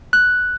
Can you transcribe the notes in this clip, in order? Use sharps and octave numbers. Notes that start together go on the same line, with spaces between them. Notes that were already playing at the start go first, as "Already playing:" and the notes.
F#6